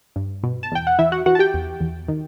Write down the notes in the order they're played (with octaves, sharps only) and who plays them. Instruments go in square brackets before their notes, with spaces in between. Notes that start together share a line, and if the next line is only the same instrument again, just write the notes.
[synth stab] G2
B2
A5
E2 G5
F#5
E3 E4 E5
F#4 F#5
E3 F#4 F#5
A5
G4 G5
E2
E2
D#3